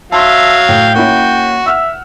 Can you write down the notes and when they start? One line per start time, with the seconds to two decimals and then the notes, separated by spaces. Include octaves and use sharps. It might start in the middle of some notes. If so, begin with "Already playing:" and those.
0.12 F#3 E5 F5 A5 C6
0.69 A2 G5
0.95 A#3 C#4 E4 F#4
1.66 E5 F#5 E6 F6